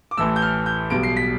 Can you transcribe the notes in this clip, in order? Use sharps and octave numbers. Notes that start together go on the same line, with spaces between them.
D6
A1 A2 E3 A3 E6
G6
F6
G6
B1 B2 G3 D7
C7
B6